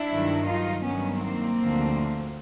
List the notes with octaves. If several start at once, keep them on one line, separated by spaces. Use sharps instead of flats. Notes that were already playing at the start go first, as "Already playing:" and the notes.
Already playing: D4 E4
G2 D#3 F#3
D#4 F4
G2 D#3 F#3 B3 C#4
A#3 C4
D2 D3 F3